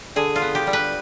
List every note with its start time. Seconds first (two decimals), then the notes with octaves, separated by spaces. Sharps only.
0.16 D3 G#4
0.36 F4
0.42 B3
0.55 G4
0.67 G3
0.73 B4